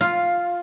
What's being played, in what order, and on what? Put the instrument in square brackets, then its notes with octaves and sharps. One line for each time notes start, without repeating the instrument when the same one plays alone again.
[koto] F4